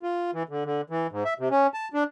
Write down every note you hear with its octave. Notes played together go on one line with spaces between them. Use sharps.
F4
E3
D3
D3
E3
G#2
E5
C3
C#4
A5
D4